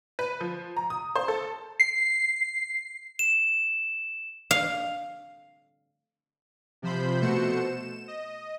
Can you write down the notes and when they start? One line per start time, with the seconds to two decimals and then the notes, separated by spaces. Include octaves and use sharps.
0.19 B4
0.41 F3
0.77 A#5
0.90 D#6
1.16 C5
1.28 A4
1.80 C7
3.19 E7
4.51 F5
6.82 C3 F3 C5 B5 G6
7.21 B2 A3 F#4 C5 C#7 E7
7.59 E7
8.08 D#5